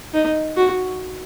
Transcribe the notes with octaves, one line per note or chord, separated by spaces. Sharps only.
D#4
F#4